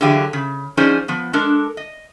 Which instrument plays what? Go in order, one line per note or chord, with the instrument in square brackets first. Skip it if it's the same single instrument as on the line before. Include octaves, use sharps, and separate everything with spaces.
[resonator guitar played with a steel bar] D3 E3 F#3 G4 G#4 F5
C#3
F3 C#4 D#4 G#4 C5 D5
F3 B3
G#3 D4 A4 A#4
D#5